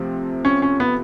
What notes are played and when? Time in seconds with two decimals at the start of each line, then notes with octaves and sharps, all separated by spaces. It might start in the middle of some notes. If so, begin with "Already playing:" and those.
Already playing: C3 F3 A3 C4
0.45 C#4
0.62 C#4
0.80 B3